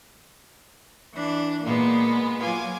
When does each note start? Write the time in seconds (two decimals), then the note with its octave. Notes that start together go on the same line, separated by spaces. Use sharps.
1.14 E3 D4
1.64 A#2 G#3 A#3 B3
2.41 F#3 F4 G#5 D6